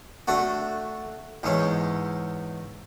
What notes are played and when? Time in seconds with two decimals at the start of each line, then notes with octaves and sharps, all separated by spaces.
0.28 A3 D4 F#4
1.43 E2 G#2 C#4